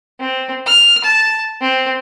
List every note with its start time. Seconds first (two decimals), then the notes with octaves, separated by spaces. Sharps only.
0.20 C4
0.66 F6
1.04 A5
1.61 C4